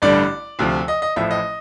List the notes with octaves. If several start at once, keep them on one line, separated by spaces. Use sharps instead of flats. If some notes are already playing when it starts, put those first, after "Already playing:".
A1 G2 D3 G3 D5
D2 C3 F3
D#5
D#5
A1 A2 F3 E5
D#5